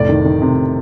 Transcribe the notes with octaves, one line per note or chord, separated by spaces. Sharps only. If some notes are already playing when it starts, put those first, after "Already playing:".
Already playing: F1 A2 D5
D#3
D#3
C3